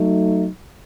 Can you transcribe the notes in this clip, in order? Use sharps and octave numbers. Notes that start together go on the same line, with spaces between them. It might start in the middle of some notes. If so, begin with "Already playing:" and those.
Already playing: F#3 A3 D#4